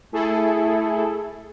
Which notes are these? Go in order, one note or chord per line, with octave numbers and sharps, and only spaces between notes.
A3 E4 G#4 A4